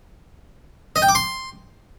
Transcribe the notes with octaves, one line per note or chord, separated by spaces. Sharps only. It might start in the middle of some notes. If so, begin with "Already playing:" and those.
D#5
G5
D6
C6